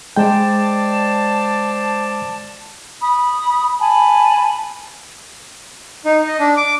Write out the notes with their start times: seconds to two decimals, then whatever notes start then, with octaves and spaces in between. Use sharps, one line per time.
0.16 G#3 C5 D5 G5 A5
3.01 B5 D#6
3.79 G#5 A5 B5
6.05 D#4
6.27 D#5
6.39 D4
6.57 D6